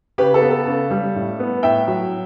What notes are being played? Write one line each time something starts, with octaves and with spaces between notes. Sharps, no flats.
C#3 G4 B4
A4
B3
A4
C#3
G3
A2
B3
A2 E5 G5
F#3